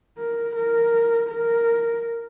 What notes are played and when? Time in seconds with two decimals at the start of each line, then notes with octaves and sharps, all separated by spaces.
0.18 A#4
0.55 A#4
1.29 A#4